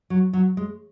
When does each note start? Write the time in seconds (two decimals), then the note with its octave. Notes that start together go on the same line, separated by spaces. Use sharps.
0.10 F#3
0.33 F#3
0.57 G#3